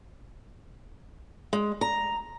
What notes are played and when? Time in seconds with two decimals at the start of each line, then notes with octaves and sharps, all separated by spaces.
1.53 G#3
1.81 A#5